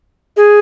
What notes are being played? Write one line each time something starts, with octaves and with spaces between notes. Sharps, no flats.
G#4